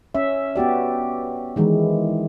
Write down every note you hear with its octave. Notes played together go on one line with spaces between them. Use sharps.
C#4 E5
B3 F#4 G4 D5
D#3 E3 G#3